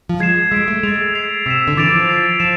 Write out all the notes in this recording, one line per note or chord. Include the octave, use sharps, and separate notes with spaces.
F3
G#3 G#6 C7 E7
G#3 E6 B6 D7
A3
G#3 A6 D7 F7
G#6 C7 F7
C3 E6 B6 E7
D3
E3 D6 A6 D7 F7
F3
A6 C7 F7
F3 E7